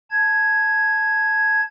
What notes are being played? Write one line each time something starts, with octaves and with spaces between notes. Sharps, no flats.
A5 G#6